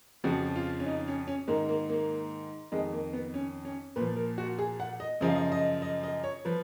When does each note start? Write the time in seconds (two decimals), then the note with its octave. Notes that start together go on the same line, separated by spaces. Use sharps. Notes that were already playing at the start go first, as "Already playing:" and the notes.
0.24 F2 C#3 F3 F#4
0.56 F4
0.80 C#4
0.86 D#4
1.08 C#4
1.27 C#4
1.48 G#2 D#3 A#3
1.69 A#3
1.90 A#3
2.72 F2 D#3 G#3
2.93 A#3
3.13 B3
3.34 C#4
3.65 C#4
3.96 A#2 F3 B4
4.17 A#4
4.38 F#4
4.59 G#4
4.80 F#5
5.00 D#5
5.21 F#2 C#3 F3 D#5
5.28 F5
5.35 D#5
5.52 D#5
5.82 D#5
6.03 D#5
6.24 C#5
6.45 F3 B4